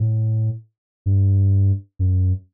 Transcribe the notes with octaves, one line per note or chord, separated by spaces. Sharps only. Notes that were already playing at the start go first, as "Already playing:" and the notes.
Already playing: A2
G2
F#2